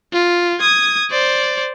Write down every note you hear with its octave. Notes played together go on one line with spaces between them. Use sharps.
F4
D#6 G#6
C5 D5